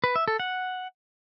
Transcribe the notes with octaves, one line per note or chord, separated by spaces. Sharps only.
B4
E5
A4
F#5